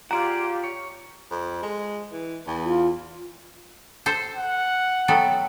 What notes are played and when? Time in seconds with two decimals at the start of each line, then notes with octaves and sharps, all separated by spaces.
0.11 F4 G4 G#4 D5 F#5 A#5
0.64 C#5
1.31 F2
1.63 G#3
2.12 E3
2.47 E2
2.65 F4
4.06 A4 C5
4.35 F#5
5.08 F#3 B3 A4 G5